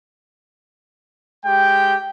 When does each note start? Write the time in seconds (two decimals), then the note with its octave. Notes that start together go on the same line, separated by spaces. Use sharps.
1.45 G#3 G4 G5